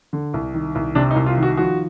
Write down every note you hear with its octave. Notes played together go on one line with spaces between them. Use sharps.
D3
C2
D#3
C2
C3 D4
D#4
C2
F4
D#3
F#4
F3 F#4